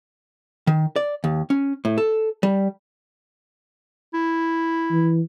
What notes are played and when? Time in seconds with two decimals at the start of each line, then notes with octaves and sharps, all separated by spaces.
0.67 D#3
0.96 D5
1.24 D#2
1.50 C#4
1.85 A2
1.98 A4
2.43 G3
4.14 E4
4.91 E3